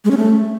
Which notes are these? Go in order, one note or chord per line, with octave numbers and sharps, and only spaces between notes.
G#3
C#4
A3